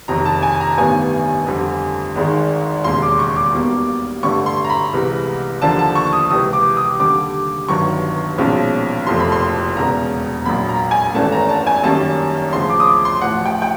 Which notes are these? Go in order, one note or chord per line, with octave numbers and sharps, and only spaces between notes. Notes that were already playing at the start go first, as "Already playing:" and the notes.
F#1 F2 C3 D#3 A#5
A5
G#5
A#5
A1 G2 D#3 G3 B3 G#5
F2 D3 G3 C4
G#1 G#2 D#3 G#3
E1 D#2 C#3 C6
D6
C#6
D6
B1 B2 G3 A#3
A1 G2 D3 G3 C#6
C6
A#5
B5
C2 C3 E3 G#3
D#2 D3 F3 A#3 D4 A5
A5
C#6
D#6
C#2 C3 E3 D#6
D6
D#6
D#2 D3 G3 D6
G1 G2 D#3 F#3 C#6
B1 A#2 F3 G#3 C#4
F#1 F2 C3 F3 A3 C6
B5
C6
E1 E2 C#3 A#5
A#1 A#2 F#3 A#3 B5
A#5
G#5
G#1 G2 E3 A3 C#4 A5
A#5
A5
G#5
F#2 D#3 G3 A#3 C#4 A5
D2 C#3 F3 C6
D6
D#6
D6
C6
A1 A2 F3 F#5
G5
G5